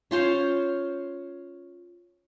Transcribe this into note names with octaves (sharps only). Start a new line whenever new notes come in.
C#4 F4 C5 C#5